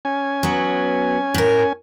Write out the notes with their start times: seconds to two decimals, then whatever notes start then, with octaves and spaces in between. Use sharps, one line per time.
0.05 C#4 G#5
0.43 F#3 B3
1.34 A2 A#4